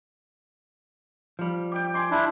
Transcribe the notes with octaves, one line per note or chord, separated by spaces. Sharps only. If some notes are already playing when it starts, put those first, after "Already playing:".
F3 G3
G4 G5
G#5 C6 D6
D4 E4